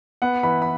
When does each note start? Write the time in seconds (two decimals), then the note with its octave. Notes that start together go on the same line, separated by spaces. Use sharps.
0.22 B3 F#5
0.43 E3 B5
0.62 B5